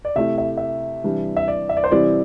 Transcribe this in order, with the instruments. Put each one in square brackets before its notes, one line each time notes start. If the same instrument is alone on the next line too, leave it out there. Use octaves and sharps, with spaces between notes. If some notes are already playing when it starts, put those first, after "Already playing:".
[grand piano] D5
[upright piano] C3 A3 E4 [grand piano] E5
[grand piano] E5
E5
[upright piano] C3 E3 G3 D4
[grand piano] E5
D5
E5
D5
C5
[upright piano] C3 E3 G3 C4 E4 [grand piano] D5